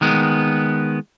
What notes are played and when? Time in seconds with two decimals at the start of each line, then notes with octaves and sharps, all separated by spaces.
0.01 D#3 G#3 B3